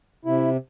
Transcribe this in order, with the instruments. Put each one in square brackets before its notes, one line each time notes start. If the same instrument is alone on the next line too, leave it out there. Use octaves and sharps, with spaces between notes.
[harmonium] C3 E4